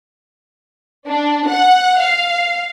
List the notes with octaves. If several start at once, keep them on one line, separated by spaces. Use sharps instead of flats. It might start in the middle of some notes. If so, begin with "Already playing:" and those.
D4
F#5
F5